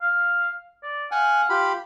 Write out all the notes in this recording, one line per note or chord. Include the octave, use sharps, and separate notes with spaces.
F5
D5
F5 F#5 G#5
F4 G4 B5